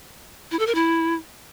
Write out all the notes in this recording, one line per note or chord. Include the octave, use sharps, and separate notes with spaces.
E4
A4
A#4
E4